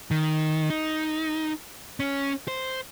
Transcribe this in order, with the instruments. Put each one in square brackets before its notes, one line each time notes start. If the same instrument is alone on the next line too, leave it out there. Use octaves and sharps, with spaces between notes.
[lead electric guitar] D#3
D#4
C#4
C5